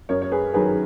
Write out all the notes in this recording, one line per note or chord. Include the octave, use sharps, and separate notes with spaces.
F#2 A#4 C#5
C#5
G#4 B4
D#3 F#3 G#4 B4